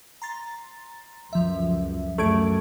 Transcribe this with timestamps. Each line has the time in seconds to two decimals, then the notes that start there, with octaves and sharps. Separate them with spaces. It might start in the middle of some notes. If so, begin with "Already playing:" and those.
0.22 A#5 C6 A6
1.33 C#2 F#2 F3 E5
2.18 F#2 A3 D6 G#6 D7